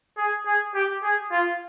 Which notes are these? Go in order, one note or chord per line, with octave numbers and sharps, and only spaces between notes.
G#4
G#4
G4
G#4
F4